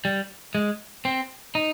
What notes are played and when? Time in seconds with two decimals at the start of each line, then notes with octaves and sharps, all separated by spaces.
0.05 G3
0.55 G#3
1.05 C4
1.55 D#4